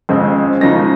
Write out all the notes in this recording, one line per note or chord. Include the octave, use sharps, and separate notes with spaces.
F2 C#3 G#3 C4
C#3 F3 G#3 D#4 A#6